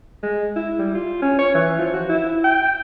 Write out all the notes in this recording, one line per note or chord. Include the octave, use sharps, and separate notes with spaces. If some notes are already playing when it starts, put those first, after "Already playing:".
G#3
E4
G3
F4
C#4
C#5
E3
F3
F#4
E4
G5